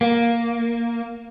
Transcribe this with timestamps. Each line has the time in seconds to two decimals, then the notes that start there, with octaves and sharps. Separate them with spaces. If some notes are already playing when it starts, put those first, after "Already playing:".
0.01 A#3